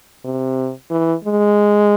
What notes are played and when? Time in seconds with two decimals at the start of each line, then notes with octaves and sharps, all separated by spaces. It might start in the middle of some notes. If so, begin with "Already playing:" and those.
0.25 C3
0.91 E3
1.24 G#3